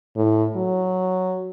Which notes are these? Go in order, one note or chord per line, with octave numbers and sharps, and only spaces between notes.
A2
F#3